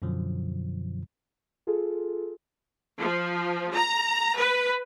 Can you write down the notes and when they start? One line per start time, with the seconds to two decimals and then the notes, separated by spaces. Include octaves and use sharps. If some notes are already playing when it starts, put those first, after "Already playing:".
0.02 F#2 B2 D3 F3 F#3
1.67 F4 G#4 A4
2.99 F3
3.74 A#5
4.36 B4